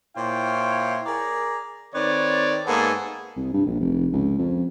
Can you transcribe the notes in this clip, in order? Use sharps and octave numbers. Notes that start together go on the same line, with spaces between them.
A#2 E4 C5 C#5 F5 G5
G#4 A#4 D5 A#5
D#3 C4 B4 C#5 D5
G#2 A#3 B3 G#4 A4
C2
G2
A#1
F1
C#2
F2